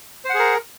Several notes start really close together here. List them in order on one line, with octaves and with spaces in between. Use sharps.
C5 F#5 G#4 A#4